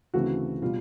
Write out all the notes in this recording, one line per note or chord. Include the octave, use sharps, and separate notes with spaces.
D2 C#3 E3 A3 C4 F#4
B2 G3 F4